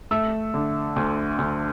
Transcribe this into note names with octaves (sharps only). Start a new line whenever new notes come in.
A3 E6
D3
D2
D2